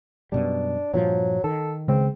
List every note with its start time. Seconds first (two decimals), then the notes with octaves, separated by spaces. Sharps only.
0.32 F#2 B2 G3 D4
0.94 G2 A#2 F3 F#3
1.44 D#3 A4
1.88 C#3 G#3 C4